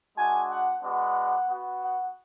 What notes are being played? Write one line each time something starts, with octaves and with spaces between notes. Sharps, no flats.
G#3 D4 F#4 G#5
F#5
G#3 B3 D4 F#4 F#5
B3 F#4
F#5